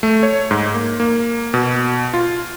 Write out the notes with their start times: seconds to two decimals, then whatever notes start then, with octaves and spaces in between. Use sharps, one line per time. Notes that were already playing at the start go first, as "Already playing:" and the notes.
0.03 A3
0.23 C#5
0.51 G#2
0.74 A#3
1.00 A#3
1.54 B2
2.14 F4